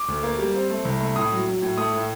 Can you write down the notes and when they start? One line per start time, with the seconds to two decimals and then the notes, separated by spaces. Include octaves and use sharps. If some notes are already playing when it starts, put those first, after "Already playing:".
Already playing: D6
0.08 D2
0.23 A#3
0.39 G3
0.54 C4
0.70 A3
0.85 C2
1.00 A3
1.16 A2 D#6
1.32 F#3
1.46 F#3
1.62 A2
1.77 A3 D#6
1.93 A2